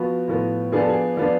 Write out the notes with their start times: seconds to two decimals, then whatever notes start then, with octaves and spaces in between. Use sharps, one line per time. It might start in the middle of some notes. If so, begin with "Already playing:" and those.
Already playing: F3 B3 F#4
0.28 A2 F3 B3
0.72 F3 B3 D4 G#4
0.81 A4
0.89 G#4
1.17 F3 B3 D4